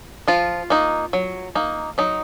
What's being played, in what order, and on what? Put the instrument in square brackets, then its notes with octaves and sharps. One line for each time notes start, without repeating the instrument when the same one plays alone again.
[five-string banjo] F3 F4
A#3 D#4
F#3
A#3 D#4
F#3 D#4